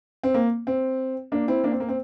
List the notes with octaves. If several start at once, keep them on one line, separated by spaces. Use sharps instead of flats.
C4
A#3
C4
A#3 D4
C4 E4
A#3 D4
C4
A#3
C4